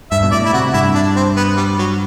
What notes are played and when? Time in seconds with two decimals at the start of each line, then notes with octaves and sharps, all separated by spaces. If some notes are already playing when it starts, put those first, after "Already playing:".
0.11 G2 E5
0.23 B2
0.32 A2 D5
0.45 E4
0.53 C3 F#4
0.73 G2 E4
0.95 D4
1.16 C4
1.37 B3
1.57 G3
1.78 F#3